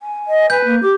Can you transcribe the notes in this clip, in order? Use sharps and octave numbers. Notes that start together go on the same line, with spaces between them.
G#5
D#5
B4 G6
A#3
G4 D6